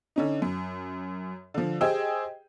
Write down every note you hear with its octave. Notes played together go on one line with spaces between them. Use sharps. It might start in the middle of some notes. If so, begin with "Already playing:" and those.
D3 C#4 D#4
F#2
D3 F3
G4 G#4 C5 D#5 G5 E6